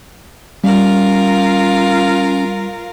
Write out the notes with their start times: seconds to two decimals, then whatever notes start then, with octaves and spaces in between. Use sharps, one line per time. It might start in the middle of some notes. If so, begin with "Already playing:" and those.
0.64 G3 C#4 F4 A#4 F5